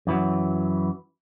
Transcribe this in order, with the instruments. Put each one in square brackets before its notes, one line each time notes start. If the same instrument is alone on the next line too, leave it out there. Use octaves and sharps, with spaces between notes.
[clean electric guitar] F#2 E3 F#3